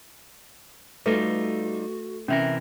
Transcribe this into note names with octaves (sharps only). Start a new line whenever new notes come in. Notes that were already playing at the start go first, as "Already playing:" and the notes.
G3 A3 D#4 F4 F#4 B4
C3 E3 C#4 A#4 E5 G5